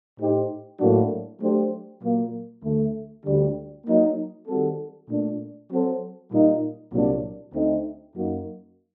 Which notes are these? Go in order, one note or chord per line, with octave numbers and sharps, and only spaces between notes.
A2 A3 D#4 G4 C5
A2 F#3 A#3 D4 F#4
F#3 A3 D4 G4 C5
A#2 F#3 A#3
D2 D3 A3
D2 D3 G3
F#3 A#3 D#4
D#3 G3 C4 F#4 A4
A#2 A3 D4
F#3 C4 F#4 A4 C5
A#2 G3 A#3 D#4
C2 A#2 F#3 A#3 D4
D2 D3 A3 C4 D#4
F#2 F#3 A#3 D#4 F#4